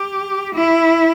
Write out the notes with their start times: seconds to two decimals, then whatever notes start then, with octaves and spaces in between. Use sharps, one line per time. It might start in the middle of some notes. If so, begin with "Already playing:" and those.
Already playing: G4
0.55 E4